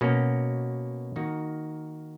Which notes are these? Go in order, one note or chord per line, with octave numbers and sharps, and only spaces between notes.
B2 A#3 C#4 F#4
D#3 A#3 D#4 F#4